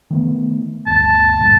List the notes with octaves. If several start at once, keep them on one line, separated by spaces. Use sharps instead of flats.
D#3 A3 B3
G1 D2 A5
F#1 G2 A#2